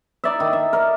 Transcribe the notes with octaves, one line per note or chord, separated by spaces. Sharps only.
D#4 D5 E5
D#3
E5
A#4 D5